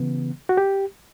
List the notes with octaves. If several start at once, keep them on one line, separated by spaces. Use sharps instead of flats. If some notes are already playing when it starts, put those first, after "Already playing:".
Already playing: C#3 E3 B3
F#4
G4